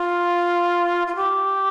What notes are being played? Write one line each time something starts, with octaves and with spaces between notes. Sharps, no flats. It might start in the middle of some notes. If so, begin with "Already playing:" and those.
Already playing: F4
F4
G4